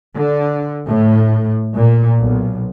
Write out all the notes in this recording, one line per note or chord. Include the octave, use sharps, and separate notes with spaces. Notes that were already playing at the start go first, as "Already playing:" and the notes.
D3
A2
A#2
B1